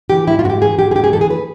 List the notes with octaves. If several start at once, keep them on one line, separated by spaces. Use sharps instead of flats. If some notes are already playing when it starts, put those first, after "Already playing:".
E3 G4
G#2 E4
F4
G#2 F#4
G4
E3 G#4
G#2 G4
G#4
G#2 G4
G#4
E3 A4
G#4
B4